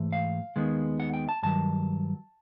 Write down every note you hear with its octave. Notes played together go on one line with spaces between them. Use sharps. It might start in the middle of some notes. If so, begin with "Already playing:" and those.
Already playing: G#2 E3 A3
F5
D#2 D#3 G#3 B3
F#5
G5
A5
G2 D#3 F#3 A5